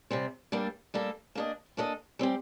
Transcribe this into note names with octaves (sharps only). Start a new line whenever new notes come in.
C3 G3 C4
G3 A#3 D4 A4
G3 A#3 D4 A4
A#3 D4 A4 D#5
A#3 D4 A4 D#5
G3 C4 G4